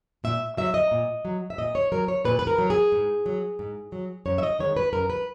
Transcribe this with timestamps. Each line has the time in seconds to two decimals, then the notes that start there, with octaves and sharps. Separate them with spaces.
0.24 A#2 E5
0.57 F#3 E5
0.74 D#5
0.91 A#2
1.25 F#3
1.50 E5
1.58 A#2 D#5
1.75 C#5
1.92 F#3 A#4
2.08 C#5
2.25 A#2 B4
2.39 B4
2.47 A#4
2.58 F#3
2.70 G#4
2.92 G#2
3.26 F#3
3.59 G#2
3.92 F#3
4.26 F#2 C#5
4.38 E5
4.43 D#5
4.59 D#3 G#3 C#5
4.77 B4
4.93 F#2 A#4
5.10 B4